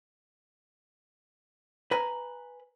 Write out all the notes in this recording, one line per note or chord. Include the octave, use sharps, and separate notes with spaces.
B4 G#5 A#5